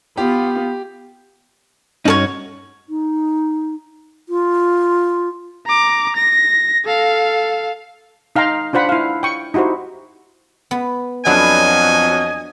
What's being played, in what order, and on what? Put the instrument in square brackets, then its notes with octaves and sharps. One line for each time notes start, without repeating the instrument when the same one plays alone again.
[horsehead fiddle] B3 F4 [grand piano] G4
[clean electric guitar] G2 C#4 D#4 [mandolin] F#4 A4 C#5
[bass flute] D#4
F4
[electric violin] A#5 D6
A#6
A4 F5
[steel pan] D#4 F5 G5 A#5 C6
D4 F4 C5 F#5 B5
E4 F5
G5 C#6
D#4 E4 F#4 G4 C5
[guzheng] B3
[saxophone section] F2 F#3 [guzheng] B3 D4 E4 [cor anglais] D#5 [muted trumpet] G#5